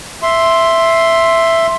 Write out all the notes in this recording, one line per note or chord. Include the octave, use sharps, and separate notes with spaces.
E5 C6